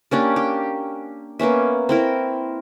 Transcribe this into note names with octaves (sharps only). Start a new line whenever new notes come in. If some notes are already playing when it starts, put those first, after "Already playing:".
A#3 C#4 D4 G4
G4
A#3 B3 C#4 E5
C4 E4 A#4